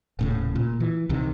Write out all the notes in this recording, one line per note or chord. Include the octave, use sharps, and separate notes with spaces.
D#1 A2 C#3
A#2
E3
C2 C3 D#3